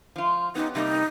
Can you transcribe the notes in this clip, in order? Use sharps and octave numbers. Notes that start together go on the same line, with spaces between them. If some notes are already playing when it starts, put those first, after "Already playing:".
F3 F4
B3 C#4 D#4 G4
C3 G3 A#3 D#4